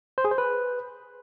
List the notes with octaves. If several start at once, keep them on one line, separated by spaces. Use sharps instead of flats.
C5
G#4
C5
B4